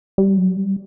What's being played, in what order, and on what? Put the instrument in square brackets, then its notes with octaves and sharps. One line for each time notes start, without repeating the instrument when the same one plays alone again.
[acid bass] G3
F#3
G3